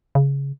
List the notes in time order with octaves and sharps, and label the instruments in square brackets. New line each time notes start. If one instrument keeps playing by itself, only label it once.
[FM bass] C#3